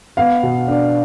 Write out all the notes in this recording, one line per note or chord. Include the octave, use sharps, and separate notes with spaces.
B3 F5
B2
D4